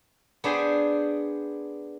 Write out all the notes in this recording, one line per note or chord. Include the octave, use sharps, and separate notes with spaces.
B3 D4 G#4 C5 G5 G#5